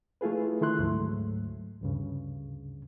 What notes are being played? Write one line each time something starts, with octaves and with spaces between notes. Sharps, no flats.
A3 E4 F4 G#4 B4
D#3 A3 E4 C6 F#6
D2 G#2 F#3 A3
D2 G2 C#3